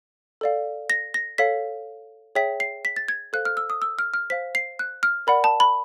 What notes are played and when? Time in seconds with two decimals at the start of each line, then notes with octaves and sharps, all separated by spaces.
0.41 A4 D5 F5
0.90 A#6
1.14 A#6
1.38 A4 C#5 F5 B6
2.35 G#4 C#5 E5 G5 B6
2.60 C7
2.85 B6
2.96 A6
3.08 G#6
3.33 A4 C5 F5 F#6
3.45 F6
3.57 E6
3.70 D#6
3.82 E6
3.99 F6
4.14 F6
4.30 C5 F5 B6
4.55 C7
4.79 F#6
5.03 F6
5.27 A#4 D5 F#5 B5
5.44 A5
5.60 B5